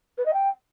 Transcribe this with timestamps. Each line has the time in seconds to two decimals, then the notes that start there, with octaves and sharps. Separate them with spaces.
0.18 B4
0.26 D#5
0.33 G5